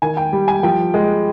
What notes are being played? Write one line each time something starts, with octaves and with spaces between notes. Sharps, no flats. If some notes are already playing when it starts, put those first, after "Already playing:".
D#3 G#5
G5
G3
G#5
F3 G5
G#3